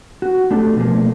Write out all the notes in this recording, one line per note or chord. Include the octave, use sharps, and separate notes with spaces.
F#4
A3 D4 G4 A4
B2 F3 A3 A#3 G#4